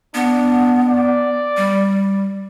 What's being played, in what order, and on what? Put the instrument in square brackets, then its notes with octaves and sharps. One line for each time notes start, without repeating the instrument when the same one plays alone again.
[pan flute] B3 [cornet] D4
[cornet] D5
[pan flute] G3